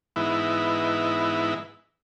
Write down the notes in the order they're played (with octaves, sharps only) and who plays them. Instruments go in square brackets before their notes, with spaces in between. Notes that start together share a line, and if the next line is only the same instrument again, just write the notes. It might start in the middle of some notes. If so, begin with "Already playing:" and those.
[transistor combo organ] G#2 E3 B3 D#4 E4